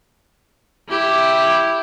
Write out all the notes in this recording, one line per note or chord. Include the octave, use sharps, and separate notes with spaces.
E4 G4